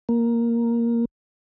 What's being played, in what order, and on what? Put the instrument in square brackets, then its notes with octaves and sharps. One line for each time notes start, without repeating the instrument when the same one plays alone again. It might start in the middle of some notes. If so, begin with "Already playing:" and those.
[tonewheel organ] A#3